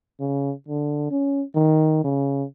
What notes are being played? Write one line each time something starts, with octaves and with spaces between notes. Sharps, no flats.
C#3
D3
C#4
D#3
C#3